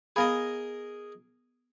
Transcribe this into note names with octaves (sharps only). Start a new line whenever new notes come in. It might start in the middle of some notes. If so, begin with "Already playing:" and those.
B3 G#4 A#4 D#5 F5 B5